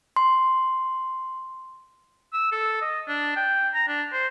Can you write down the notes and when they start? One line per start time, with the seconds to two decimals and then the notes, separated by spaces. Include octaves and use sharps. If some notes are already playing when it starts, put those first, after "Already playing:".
0.16 C6
2.33 E6
2.52 A4
2.82 D#5
3.08 D4
3.36 G5
3.74 A#5
3.88 D4
4.12 C5